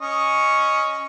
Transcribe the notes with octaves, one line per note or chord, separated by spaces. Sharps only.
C#4 D#5 C#6